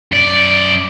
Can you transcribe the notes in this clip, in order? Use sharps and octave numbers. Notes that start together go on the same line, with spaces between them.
F#2 D5